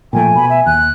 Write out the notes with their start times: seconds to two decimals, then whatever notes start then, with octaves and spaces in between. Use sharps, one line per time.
0.13 A#2 F3 A3 G5 G#5
0.35 B2 B5
0.50 E5
0.66 D#2 F#6